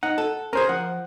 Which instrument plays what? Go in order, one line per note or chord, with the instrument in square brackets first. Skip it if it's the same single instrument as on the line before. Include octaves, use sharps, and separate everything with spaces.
[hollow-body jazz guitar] D#4 [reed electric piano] F#5
[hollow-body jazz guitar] A4
[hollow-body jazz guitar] C#4 G#4 [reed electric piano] A#4 C5
[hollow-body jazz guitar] F3 [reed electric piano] F#5